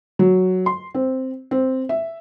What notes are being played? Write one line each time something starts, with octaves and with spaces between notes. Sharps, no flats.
F#3
C6
C4
C4
E5